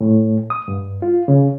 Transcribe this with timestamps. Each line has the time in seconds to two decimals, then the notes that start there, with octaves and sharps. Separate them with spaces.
0.01 A2
0.50 D#6
0.68 G2
1.02 F4
1.28 C#3